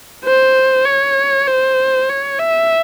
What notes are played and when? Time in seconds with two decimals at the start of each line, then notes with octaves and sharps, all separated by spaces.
0.24 C5
0.86 C#5
1.47 C5
2.09 C#5
2.39 E5